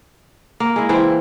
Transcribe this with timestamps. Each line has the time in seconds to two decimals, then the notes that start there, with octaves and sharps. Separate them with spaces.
0.60 A#3
0.76 G#3 E4
0.89 E3 E4 C5 G5